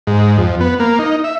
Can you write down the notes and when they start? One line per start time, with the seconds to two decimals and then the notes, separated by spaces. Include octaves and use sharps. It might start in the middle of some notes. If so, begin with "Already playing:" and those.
0.07 G#2
0.38 F2
0.61 B3
0.80 A#3
0.99 D#4
1.24 E5